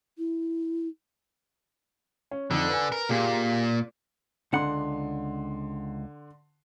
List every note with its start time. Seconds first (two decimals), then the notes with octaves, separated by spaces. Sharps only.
0.18 E4
2.31 C#4
2.51 F2 D3 D#4
2.69 B4 G#5
2.92 A#4
3.09 A#2 A#3 G4 G#4
4.53 C#2 D3 F#5 C6